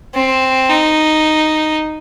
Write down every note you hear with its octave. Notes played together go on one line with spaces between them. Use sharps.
C4
D#4